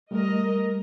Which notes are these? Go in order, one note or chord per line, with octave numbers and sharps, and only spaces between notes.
G3 A3 A#4 D#5